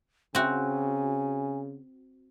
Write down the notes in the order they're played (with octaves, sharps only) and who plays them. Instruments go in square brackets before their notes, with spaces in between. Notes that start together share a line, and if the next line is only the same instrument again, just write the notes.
[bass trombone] C#3 [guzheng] C4 F#4 [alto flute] G#5